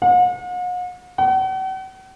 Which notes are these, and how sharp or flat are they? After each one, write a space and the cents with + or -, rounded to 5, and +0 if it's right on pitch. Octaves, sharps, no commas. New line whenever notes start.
F#5 -45
F#5 +45